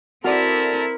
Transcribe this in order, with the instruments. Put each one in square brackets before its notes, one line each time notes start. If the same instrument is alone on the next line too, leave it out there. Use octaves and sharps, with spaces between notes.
[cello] C4 E4 [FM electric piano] F#4 D5 [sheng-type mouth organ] A4 A#5 [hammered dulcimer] A#4